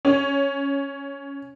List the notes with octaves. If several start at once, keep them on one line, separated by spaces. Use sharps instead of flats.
C#4